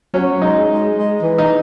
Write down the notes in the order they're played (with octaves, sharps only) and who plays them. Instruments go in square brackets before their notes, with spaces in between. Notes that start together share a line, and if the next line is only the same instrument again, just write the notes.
[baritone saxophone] F#3 [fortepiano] C#4
[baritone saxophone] G#3 [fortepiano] D#4
[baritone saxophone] G#3
G#3
E3
[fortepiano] D#4